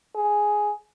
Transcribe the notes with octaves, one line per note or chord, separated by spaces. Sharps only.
G#4